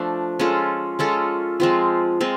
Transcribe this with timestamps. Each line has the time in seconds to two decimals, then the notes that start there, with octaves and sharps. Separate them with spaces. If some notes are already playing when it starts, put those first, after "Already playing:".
Already playing: F3 A3 D4
0.39 G#3 C#4 F4 A4
0.99 G#3 C#4 F4 A4
1.60 F3 G#3 C4 F4
2.20 G#3 C4 F4